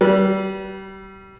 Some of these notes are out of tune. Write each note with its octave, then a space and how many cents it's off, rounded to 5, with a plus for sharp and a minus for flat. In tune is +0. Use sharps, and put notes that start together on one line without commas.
G3 -30 B4 -25